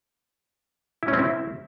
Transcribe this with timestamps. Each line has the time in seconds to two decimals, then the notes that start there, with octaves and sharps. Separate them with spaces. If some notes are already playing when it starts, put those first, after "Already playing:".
1.03 E4
1.08 C#4
1.13 C4
1.19 E4